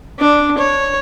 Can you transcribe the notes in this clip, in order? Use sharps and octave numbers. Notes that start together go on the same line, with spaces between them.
D4
C#5